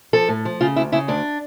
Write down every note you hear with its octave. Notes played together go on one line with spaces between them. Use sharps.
F3 A4
A2
F3
C#3 F4
D2 E4
C#3 E4
D2 D4